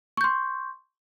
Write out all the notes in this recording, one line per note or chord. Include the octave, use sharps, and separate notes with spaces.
C6 C#6 G6